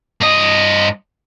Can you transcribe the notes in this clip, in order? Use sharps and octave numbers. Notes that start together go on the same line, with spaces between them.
G2 D#5